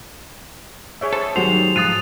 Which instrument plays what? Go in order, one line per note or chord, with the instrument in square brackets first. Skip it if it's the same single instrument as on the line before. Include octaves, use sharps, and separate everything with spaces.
[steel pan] G#4 C#5 E5
[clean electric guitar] A4 [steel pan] C5
[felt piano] D#3 F#3 G3 [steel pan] F#4 G#4 [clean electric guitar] C5 [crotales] F7
[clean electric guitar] G#2 F3 [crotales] D#6 A6 D#7 [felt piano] F#6 C7